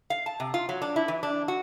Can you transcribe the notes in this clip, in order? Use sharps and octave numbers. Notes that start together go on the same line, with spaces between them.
F5
A5
C3
F4
F#3
D4
E4
E3
D4
F#4